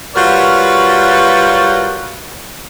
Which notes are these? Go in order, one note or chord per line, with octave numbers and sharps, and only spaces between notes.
G3 F4 F#4 A#4 B4 C#5